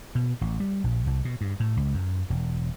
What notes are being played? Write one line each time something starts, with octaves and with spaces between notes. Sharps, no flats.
B2
A1
G3
A#1
C2
B2
G2
A2
C#2
F#2
E1